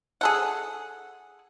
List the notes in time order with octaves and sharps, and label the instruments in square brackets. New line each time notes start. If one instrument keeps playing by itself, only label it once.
[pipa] G#4 A4 F#5